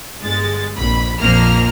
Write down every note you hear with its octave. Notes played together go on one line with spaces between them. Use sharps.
G1 G#3 A6
A#1 F2 B5
A#1 F2 F3 A#3 A#5 F6